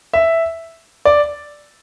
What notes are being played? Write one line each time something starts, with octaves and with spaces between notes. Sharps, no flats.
E5
D5